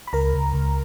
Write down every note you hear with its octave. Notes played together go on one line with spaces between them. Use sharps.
B5
C#2 A#4 A#5
C#2
C#2